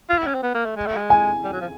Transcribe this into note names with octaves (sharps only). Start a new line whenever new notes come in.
F4
E4
C#4
C4
B3
A#3
A3
G#3
A3
G#3
G#5
G3
F#3
F3